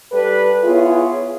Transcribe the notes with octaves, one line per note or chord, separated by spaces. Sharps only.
G3 A4 B4
B3 E4 F4 G#4 C#5